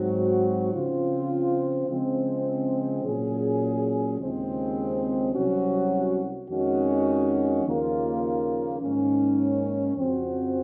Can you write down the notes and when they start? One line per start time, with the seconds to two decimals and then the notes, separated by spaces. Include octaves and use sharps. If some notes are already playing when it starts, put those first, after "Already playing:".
Already playing: G#2 F#3 C4 F#4
0.73 C#3 F3 C4 F4
1.88 C#3 F3 G#3 C4
3.03 A#2 F#3 C#4 G#4
4.18 D#2 C#3 F3 G#3 C4
5.33 C2 C3 F#3 C#4 F#4
6.48 F2 D#3 G#3 C#4 F#4
7.64 D#2 C#3 F3 A#3 F4
8.80 G#2 D#3 A#3 C#4
9.94 F2 C#3 F3 C4 F#4